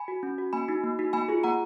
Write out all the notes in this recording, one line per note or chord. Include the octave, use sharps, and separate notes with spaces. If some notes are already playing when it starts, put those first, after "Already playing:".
Already playing: G#5 B5
F#4
C#4
F#4
A#3 G#5 B5
D#4 F#4
A#3
D#4 F#4
A#3 G#5 B5
F4 G#4
A#3 F#5 A#5